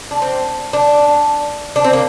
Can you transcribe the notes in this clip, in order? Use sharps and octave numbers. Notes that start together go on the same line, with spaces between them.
D4
C4
D4
D4
C4
A#3